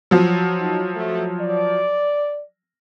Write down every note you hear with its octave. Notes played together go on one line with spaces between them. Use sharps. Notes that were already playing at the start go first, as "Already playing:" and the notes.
F3 F#3
D#4
A3
D5